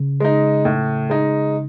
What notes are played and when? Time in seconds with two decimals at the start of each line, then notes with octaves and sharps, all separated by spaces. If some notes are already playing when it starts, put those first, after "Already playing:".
Already playing: C#3
0.20 G#3 D#4
0.65 A2
1.10 G#3 D#4